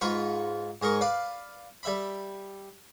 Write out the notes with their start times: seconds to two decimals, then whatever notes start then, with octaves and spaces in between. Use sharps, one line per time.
0.01 G#2 F4 B4 C#6
0.82 G#2 G#4 A#4 C#6
1.01 B4 D5 F5
1.83 G3 E5 B5